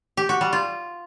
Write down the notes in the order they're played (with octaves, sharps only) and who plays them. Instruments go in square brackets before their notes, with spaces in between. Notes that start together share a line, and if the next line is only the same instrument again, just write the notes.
[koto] G4
F#4
G3
F4